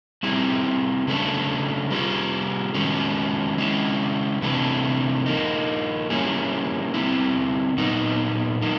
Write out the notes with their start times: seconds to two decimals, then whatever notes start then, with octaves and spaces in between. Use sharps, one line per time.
0.23 G3 C4 E4 G#4
1.07 C#3 F#3 A3 D4
1.90 G3 A#3 C#4 F4 G#4
2.75 D#3 G#3 C#4 F#4
3.58 G#3 C#4 E4
4.42 C3 E3 A3 D4
5.26 F3 A#3 D#4
6.10 G3 A#3 C#4 E4 G#4
6.94 D3 G3 C4 E4
7.78 A#2 F#3 B3 D#4
8.62 F#3 A#3 D#4